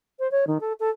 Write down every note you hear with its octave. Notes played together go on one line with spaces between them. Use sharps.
C5
C#5
D#3
A4
A4